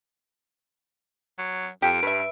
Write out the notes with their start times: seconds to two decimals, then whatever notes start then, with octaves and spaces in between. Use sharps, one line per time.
1.38 F#3
1.82 F2 G4 D7
2.03 G2 B4 E5